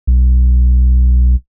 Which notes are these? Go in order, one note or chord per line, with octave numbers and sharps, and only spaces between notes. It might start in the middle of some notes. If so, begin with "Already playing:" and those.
B1